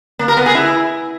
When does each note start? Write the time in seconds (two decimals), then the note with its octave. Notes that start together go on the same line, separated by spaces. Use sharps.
0.19 A#3
0.28 A#4
0.37 B3
0.46 G#4
0.55 E4